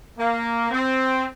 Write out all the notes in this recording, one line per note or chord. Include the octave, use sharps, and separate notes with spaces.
A#3
C4